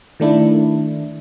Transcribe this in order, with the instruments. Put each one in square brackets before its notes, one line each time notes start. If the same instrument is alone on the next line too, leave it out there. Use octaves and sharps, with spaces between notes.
[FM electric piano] D#3 A3 D4 E4